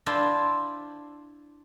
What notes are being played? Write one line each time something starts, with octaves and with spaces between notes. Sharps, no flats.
D4 E4 F4 C5